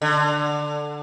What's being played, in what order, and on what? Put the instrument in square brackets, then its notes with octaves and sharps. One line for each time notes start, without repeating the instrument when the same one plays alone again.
[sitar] D3